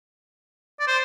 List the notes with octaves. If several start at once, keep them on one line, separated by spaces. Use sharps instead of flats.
D5
C5